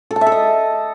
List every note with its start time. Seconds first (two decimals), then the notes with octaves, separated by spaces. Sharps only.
0.11 A4
0.16 A5
0.21 E5
0.27 A4
0.32 D#5